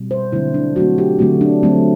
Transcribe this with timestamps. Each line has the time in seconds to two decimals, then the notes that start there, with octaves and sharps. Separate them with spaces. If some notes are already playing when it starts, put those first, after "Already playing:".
Already playing: B2 G3 C4
0.11 C5
0.32 D3 F#3 A3 C4 E4
0.54 D4
0.76 D3 F#3 A3 C4 F#4
0.98 G4
1.19 D3 F#3 A3 C4 F#4
1.41 D4
1.63 D3 F#3 A3 C4